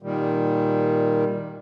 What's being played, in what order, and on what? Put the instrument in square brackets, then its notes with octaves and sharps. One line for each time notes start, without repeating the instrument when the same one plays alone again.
[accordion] A#2 D#3 G3